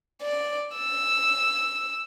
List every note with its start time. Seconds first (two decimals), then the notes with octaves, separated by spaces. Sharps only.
0.22 D5
0.77 E6